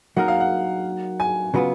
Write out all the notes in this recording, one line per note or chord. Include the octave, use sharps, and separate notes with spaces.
F#3 A#3 D#4 A#4 F#5
F5
F#5
G#5
C#3 F#3 B3 F4